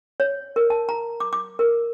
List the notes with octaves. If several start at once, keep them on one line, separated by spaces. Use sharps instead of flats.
C#5
A#4
A5
A#5
D6
D6
A#4